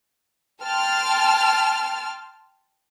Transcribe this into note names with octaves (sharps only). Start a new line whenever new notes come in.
G5 A5 C6 F6